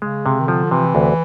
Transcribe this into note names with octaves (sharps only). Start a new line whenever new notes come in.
C#3 G#3
C3
D#3
D3 F3
C3 E3
D2